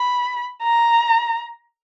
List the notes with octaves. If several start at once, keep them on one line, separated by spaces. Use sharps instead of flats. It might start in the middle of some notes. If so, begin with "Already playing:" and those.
Already playing: B5
A#5